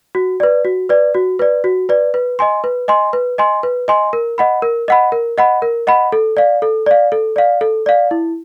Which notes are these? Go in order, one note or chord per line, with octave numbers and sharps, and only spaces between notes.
F#4
B4 D5
F#4
B4 D5
F#4
B4 D5
F#4
B4 D5
B4
D#5 G#5 C6
B4
D#5 G#5 C6
B4
D#5 G#5 C6
B4
D#5 G#5 C6
A#4
D#5 F#5 B5
A#4
D#5 F#5 B5
A#4
D#5 F#5 B5
A#4
D#5 F#5 B5
A4
D5 F5
A4
D5 F5
A4
D5 F5
A4
D5 F5
E4